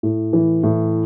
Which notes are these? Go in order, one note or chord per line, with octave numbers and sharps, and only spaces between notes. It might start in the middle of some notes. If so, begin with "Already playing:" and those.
A2
E3
A2